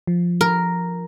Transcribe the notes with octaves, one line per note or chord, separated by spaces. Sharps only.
F3
A#4